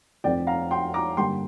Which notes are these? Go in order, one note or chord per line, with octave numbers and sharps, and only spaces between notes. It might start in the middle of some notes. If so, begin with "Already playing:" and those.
F1 F2 F3 C4 D5 G5
F5 A#5
G5 C6
A#5 D6
G2 D3 G3 A#3 G5 C6